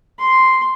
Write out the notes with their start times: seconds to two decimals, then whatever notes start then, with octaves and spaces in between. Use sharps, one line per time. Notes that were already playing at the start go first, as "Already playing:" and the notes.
0.19 C6